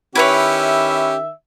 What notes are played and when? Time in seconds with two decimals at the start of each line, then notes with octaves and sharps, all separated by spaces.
0.15 D#3 C#4 E4 G4 B4 C#5 E5